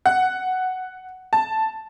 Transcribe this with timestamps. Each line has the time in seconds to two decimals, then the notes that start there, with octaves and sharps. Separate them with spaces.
0.06 F#5
1.33 A5